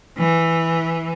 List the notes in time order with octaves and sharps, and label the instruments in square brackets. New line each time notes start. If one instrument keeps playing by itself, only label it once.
[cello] E3